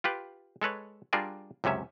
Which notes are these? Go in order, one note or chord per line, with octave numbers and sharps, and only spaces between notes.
F4 G4 B4
G#3 A4 B4 C#5
G3 D4 F4 G#4 A#4 D5
C#2 F#2 C3 C#4 E5